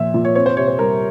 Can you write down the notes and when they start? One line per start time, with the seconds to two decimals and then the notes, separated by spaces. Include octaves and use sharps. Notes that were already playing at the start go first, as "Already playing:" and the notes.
Already playing: A#2 F3 E5
0.14 A#2
0.25 C#5
0.35 C4 C#5
0.46 C5
0.57 C3 C#5
0.68 C5
0.79 G3 A#4